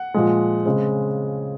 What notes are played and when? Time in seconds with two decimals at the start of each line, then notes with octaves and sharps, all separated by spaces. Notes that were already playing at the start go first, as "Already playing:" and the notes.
Already playing: F#5
0.14 A#2 F3 G#3
0.66 C#3 G#3 C4